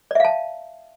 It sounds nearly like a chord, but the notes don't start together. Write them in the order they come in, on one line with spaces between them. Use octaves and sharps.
D5 E5 F5 A5